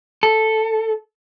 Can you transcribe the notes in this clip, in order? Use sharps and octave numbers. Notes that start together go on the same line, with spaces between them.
A4